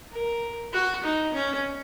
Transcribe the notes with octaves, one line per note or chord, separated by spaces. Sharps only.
A#4
F#4
D#4
C#4